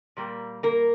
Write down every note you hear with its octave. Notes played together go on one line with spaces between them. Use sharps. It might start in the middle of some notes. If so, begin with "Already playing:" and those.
A#2 G3 A#3
A#3 A#4